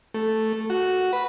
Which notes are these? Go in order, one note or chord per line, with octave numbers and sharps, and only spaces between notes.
A3
F#4
B4